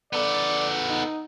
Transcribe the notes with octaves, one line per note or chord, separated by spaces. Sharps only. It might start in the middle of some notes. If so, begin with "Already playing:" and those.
B3 A4 D5
D#4